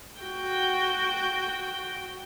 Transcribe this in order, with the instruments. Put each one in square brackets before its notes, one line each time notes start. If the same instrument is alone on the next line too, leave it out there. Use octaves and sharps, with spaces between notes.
[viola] F#4 G5